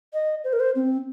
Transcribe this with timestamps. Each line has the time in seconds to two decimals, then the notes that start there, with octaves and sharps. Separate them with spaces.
0.13 D#5
0.44 C5
0.53 A#4
0.60 C5
0.75 C4